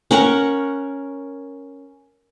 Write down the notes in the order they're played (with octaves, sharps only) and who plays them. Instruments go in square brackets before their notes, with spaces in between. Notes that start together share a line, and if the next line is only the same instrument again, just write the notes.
[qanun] C#4 A#4 F#5 C#6